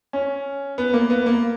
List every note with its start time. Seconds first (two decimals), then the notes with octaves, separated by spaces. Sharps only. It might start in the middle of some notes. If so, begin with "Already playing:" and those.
0.13 C#4
0.78 B3
0.93 A#3
1.10 B3
1.26 A#3